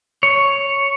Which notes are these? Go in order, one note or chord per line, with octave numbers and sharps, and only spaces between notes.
C#5